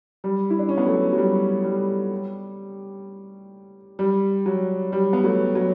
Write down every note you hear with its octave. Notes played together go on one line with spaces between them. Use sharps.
G3
E4
D4
C#4
B3
F#3 A3
F#3
G3
G3
G3
F#3
G3
B3
F#3 A3
F#3